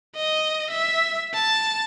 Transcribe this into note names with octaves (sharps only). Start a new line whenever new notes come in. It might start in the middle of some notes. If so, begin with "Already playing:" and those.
D#5
E5
A5